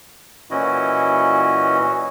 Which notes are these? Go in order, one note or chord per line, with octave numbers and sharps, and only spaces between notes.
A#2 E3 C#4 E4 F#4 D#5